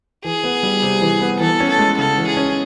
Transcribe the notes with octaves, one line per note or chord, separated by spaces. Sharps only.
E3 G#4
B3
G3
C3
E3
B3
E3 A4
C#4
A4
G#3
C#3 A4
E3
G#4
C#4